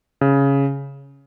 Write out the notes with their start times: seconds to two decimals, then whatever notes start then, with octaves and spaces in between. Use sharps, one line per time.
0.21 C#3